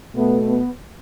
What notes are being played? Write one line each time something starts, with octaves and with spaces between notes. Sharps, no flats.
B2 A3 B3
B3